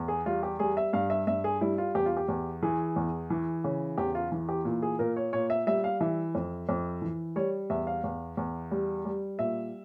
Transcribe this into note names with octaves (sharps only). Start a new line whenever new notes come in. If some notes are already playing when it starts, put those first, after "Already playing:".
Already playing: E2
G#4
G3 F4
G4
G3 G#4
E5
G2 F5
E5
G2 E5
G#4
G3 E4
F4
E2 G4
F4
G4
E2
E3 G#4
E2
E3
C#3
E2 G4
F4
E3
G4
A#2
G#4
A#2 A#4
C#5
A#2 C#5
E5
G3 E5
F5
E3 E5
F2
F2
E3
G3 C#5
E2 E5
F5
E2
E2
G3
G3
A#2 E5